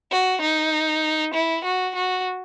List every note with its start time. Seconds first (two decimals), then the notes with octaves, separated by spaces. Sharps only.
0.11 F#4
0.41 D#4
1.34 E4
1.65 F#4
1.95 F#4